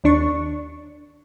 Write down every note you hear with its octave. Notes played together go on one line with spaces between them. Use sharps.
D#2 D4 C#6